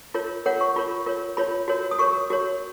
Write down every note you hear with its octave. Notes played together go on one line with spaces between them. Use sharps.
F4 A#4 C#5
F4 A#4 C#5 F#5
C#6
F4 A#4 C#5 B5
F4 A#4 C#5
F4 A#4 C#5 B5
F#4 A#4 C#5
D#6
F#4 A#4 C#5 C#6
F#4 A#4 C#5